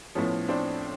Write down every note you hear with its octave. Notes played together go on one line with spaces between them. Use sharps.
A2 F3 B3 C#4
C4 D4